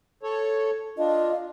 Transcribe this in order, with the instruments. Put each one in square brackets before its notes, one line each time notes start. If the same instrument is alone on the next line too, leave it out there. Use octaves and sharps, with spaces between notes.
[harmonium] A4 C#5
[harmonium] D4 F4 [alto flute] D#5